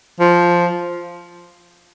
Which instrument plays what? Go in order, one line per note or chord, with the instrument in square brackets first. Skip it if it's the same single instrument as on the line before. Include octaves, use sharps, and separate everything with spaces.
[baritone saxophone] F3